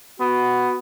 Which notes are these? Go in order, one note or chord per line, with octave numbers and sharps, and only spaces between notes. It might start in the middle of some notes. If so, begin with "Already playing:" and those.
B3 F#4